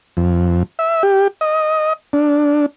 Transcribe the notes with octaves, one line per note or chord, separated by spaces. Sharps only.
F2
E5
G4
D#5
D4